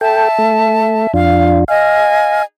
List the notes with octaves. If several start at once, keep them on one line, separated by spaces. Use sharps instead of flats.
A4 E5 G5 A5
A3
F2 D4 F4 F5
D#5 F5 G#5